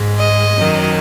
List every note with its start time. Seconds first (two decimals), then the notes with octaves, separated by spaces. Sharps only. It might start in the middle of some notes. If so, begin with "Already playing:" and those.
Already playing: G#2 G#3
0.19 D#5
0.56 F#2 D#3 F#3